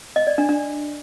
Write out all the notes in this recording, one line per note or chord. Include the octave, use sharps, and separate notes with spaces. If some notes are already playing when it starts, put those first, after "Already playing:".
D#5
D5
D4
D4